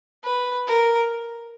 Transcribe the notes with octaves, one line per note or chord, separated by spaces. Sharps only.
B4
A#4